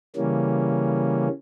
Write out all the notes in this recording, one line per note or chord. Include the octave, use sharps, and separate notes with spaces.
C#3 E3 G3 A#3 C#4